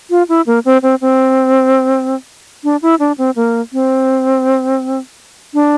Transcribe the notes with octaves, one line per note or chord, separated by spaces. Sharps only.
F4
E4
A#3
C4
C4
C4
D4
E4
D4
C4
A#3
C4
D4